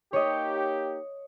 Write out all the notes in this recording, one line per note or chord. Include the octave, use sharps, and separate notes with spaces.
A#3 D#4 G4 C#5 D#5